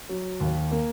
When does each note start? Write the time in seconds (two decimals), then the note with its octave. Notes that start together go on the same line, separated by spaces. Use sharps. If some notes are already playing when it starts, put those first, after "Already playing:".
0.09 F#3
0.40 D#2
0.71 A#3